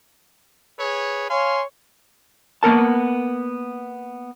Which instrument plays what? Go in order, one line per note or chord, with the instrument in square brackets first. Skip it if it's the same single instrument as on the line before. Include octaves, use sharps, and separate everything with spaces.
[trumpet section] G#4 B4 C#5
[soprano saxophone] C#5 [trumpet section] F5 G#5 C6
[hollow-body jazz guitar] A#3 B3 A#4 A5